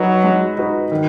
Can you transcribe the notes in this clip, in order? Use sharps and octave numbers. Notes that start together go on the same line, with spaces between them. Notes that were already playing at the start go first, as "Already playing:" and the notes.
Already playing: F#3 D#4 F#4 B4
G#3
D#4 F#4 B4
D#3